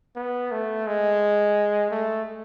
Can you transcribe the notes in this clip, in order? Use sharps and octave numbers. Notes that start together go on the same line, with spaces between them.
B3
A3
G#3
A3